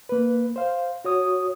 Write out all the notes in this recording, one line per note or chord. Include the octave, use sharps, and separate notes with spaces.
A#3 B4
C5 F5
F#4 C#5 D#6